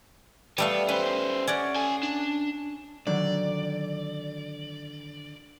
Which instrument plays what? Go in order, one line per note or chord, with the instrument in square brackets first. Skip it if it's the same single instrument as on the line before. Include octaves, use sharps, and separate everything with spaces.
[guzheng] G3 A3 F5 [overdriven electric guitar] B3
[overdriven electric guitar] C#4 C5 [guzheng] B4
[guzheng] C#4 D5 F#5
[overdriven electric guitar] A4 G#5
D4
[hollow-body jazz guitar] D3 D#3 F#3 [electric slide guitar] D5